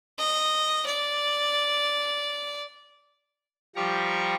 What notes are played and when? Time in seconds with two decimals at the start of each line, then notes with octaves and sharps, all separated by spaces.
0.19 D#5
0.86 D5
3.76 F3 G3 G4 A#5 C#6